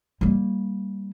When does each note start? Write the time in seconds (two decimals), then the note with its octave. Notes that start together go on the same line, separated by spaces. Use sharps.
0.21 G3 A#3